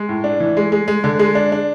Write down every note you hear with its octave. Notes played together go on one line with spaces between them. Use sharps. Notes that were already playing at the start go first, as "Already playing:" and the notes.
Already playing: G#3
A2
D4
E3
G#3
G#3
G#3
D3
G#3
D4
D4